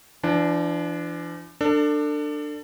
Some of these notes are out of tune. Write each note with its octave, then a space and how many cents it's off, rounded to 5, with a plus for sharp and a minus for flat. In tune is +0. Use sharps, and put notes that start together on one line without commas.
E3 +45 D4 +0
D4 +15 A4 +35